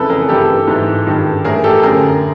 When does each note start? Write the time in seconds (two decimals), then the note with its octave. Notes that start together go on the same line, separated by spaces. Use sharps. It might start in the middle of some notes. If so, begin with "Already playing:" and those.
Already playing: F2 C#3 E3 A4 B4
0.10 G#4 A#4
0.29 G2 E3 G4 A4
0.68 G#2 E3
1.07 G2 D#3
1.45 A2 E3 G#4 A#4
1.64 G4 A4
1.83 F#2 D3 G#4 A#4